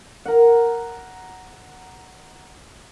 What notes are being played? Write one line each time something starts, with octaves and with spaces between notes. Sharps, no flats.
A#4 F#5